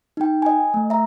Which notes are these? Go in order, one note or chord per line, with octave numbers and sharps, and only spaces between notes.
D#4 G5
D#5 G#5
A3
E5 A#5